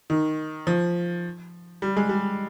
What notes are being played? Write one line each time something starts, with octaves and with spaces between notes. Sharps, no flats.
D#3
F3
G3
G#3
G3